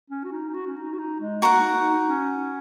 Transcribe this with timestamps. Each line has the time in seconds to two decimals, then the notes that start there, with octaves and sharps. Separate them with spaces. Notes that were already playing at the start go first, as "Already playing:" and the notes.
0.10 C#4
0.24 F#4
0.32 D#4
0.49 D#4
0.54 F#4
0.67 C#4
0.77 D#4
0.93 F#4
0.99 D#4
1.20 G#3
1.42 A#3 F#4 A#4 F#5
1.59 D#4
1.75 D#4
1.92 D#4
2.09 C#4